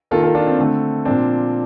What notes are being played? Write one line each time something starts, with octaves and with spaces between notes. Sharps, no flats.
D#3 A#3 F4 A4
F4 A4
D4 F4
C4
D3 A3 C4
A#2 F3 C4 D4